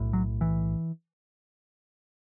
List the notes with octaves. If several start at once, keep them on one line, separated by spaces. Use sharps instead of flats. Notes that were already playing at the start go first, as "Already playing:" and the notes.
Already playing: B1 A2
F#3
E3